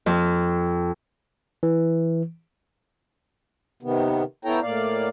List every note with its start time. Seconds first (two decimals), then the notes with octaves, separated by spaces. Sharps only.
0.06 F2
1.63 E3
3.83 C3 D#3 B3
4.45 B3 E4 A4 C#5 G5 A#5
4.62 A2 A#3 D5 F5